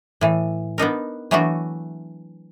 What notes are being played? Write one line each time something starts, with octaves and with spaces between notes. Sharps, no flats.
A2 E3
B3 D4 D#4 A#4
E3 F#3 A3 B3 D4 F#4